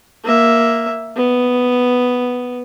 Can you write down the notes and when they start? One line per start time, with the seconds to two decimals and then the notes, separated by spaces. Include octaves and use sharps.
0.24 A#3 E5
1.16 B3